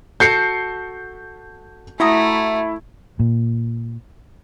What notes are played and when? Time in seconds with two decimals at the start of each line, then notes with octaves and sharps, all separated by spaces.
0.20 F#4 A4 G6 C7 C#7
2.00 A3 E4 F#4 A#5 D#6
3.20 A#2